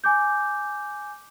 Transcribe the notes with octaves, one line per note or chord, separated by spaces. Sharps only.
G#5 D6 G6